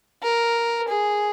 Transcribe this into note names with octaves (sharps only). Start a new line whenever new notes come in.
A#4
G#4